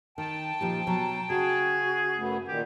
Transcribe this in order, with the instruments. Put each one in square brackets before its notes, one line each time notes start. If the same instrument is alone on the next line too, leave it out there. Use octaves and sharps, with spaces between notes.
[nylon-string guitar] D#3 [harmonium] G5 A5
[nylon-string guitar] A#2 F3 D#4 [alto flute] G4
[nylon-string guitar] B2 F#3 [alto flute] A#5
[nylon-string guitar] C#3 [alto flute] F#4 [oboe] G#4
[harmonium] F#2 A3 B3
[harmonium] A#2 D#3 [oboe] G4